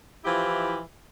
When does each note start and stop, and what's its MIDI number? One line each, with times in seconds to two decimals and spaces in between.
0.24 0.78 52
0.24 0.78 53
0.24 0.78 64
0.24 0.78 67